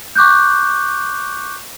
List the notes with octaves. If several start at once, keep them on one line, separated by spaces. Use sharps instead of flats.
C#6 D6 F#6 G6